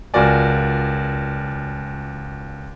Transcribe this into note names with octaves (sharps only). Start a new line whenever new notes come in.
C#2 F4 F#4 A#4 D5 G#5